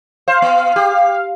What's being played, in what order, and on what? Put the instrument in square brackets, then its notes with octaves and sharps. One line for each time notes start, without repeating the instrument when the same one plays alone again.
[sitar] C5 [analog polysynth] F5
[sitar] B3
G4